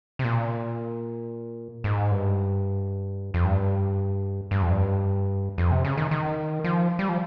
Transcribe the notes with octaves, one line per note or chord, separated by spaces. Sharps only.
C3
A#2
G#2
G2
F2
G2
G2
F2
G2
F2
C3
C#3
D#3
D#3
F3
G3
F3